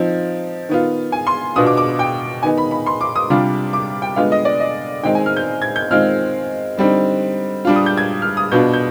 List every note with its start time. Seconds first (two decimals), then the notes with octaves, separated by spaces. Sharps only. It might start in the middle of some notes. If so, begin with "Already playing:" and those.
Already playing: F3 C4 D#4
0.69 D#3 B3 F4
1.12 G#5
1.27 C6
1.56 B2 B3 D4 F4 D#6
1.67 D6
1.77 D6
1.99 G5
2.43 D#3 B3 D#4 G#5
2.58 B5
2.71 B5
2.87 C6
3.01 D6
3.16 D#6
3.30 C3 G3 D4 F4 D6
3.73 D6
4.02 G5
4.16 D3 G#3 B3 F4 F5
4.32 D#5
4.45 D5
4.60 D#5
5.03 D#3 G#3 C4 D#4 G5
5.15 G#5
5.26 F6
5.37 G6
5.62 G#6
5.76 G6
5.91 D#3 G#3 C4 F4 F6
6.77 D3 G3 C4 D#4
7.65 G3 D4 F4
7.76 D#6
7.86 G6
7.97 G#6
8.22 F6
8.37 D#6
8.52 B2 B3 D4 F4 G6
8.74 G6